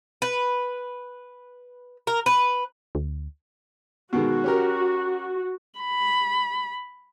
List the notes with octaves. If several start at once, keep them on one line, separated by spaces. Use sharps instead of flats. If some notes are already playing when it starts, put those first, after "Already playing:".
B4
A#4
B4
D2
B2 D#3 G#3 F#4
C#4 G4 A#4
B5